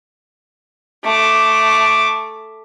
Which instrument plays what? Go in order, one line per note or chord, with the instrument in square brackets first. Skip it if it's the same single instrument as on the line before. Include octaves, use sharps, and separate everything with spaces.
[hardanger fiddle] A3 D6